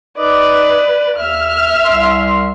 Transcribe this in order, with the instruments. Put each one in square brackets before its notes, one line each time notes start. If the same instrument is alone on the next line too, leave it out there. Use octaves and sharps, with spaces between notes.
[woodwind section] D#4 D#5 D6 [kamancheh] B4 D5
[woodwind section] D#2 [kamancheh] E5 F6
[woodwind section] C2 C6